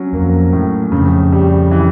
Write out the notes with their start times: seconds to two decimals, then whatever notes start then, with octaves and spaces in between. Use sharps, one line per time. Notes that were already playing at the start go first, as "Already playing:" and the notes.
Already playing: F#3 C#4
0.13 F2 A#3
0.53 F#2 A2
0.92 F2 C#3
1.32 G3
1.71 E3